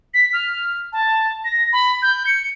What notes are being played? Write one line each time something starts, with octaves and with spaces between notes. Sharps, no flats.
B6
F6
A5
A#6
B5
G6
C#7